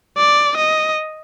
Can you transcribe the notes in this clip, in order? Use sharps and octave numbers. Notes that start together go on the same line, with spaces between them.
D5
D#5